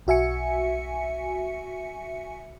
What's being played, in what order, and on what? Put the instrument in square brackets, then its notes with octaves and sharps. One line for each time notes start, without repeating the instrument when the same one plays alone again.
[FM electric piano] B1 F#4 E5 G#5 C#7